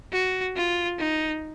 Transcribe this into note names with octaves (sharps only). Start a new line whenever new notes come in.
F#4
F4
D#4